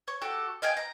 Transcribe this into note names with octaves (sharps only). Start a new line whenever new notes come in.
C#5
F#4 G4 A4
D#5 F5 G5 G#5
A#5